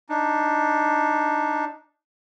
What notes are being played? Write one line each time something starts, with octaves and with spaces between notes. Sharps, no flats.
D4 D#4